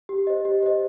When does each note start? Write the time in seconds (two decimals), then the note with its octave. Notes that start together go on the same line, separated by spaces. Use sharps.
0.09 G4
0.27 C5 D#5
0.45 G4
0.63 C5 D#5